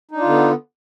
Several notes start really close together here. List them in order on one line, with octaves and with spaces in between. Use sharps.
D#4 D4 F4 D3 B3